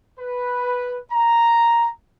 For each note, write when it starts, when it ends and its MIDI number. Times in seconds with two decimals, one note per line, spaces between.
0.19 0.97 71
1.10 1.87 82